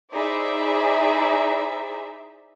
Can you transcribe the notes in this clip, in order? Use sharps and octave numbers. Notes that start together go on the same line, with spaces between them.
D#4 E4 G#4 C5 D5 E5